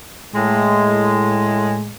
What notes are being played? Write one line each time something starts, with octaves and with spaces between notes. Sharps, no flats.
A2 G#3